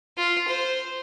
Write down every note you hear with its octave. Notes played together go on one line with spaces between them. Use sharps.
F4
C5